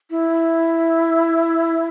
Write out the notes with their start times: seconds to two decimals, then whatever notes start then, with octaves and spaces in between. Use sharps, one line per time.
0.11 E4